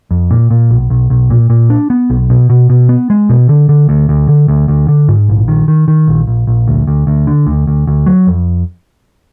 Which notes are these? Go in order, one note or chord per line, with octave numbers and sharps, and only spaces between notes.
F2
A#2
A#2
B1
B1
B1
A#2
A#2
D4
B3
B1
B2
B2
B2
B3
G#3
B2
D3
D3
D2
D2
D3
D2
D2
D3
G#2
A#1
D#3
D#3
D#3
A#1
A#1
A#1
D2
D2
D2
D3
D2
D2
D2
F#3
F2